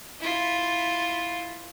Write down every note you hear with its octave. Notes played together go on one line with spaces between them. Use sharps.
E4 F4